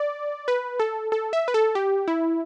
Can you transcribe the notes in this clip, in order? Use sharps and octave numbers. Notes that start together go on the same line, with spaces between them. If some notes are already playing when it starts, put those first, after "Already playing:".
Already playing: D5
B4
A4
A4
E5
B4
A4
G4
E4